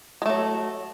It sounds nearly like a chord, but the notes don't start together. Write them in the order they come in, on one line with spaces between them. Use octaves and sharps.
G#3 A3 F#3